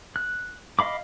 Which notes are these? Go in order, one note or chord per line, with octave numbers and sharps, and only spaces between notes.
F#6
D#5 F5 B5 D6